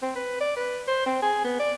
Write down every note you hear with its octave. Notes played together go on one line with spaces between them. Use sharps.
C4
B4
D5
B4
C5
C4
G#4
B3
D5